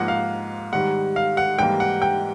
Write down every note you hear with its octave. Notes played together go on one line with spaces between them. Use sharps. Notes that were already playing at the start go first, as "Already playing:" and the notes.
Already playing: G#2 F3 A#3 F#5
F5
G#2 D#3 G3 F#5
F5
F#5
G#2 E3 G3 A#3 G5
F#5
G5